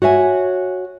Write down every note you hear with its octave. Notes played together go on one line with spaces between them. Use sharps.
F#4 C#5 E5 G#5